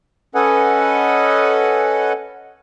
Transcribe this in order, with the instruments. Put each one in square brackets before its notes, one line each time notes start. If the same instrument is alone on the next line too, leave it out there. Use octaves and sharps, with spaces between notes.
[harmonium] C#4 A4 B4 D#5 F#5 G#5